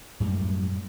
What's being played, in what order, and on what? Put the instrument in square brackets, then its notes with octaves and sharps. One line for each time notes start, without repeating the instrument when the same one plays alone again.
[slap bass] F#2 A2 G3 G#3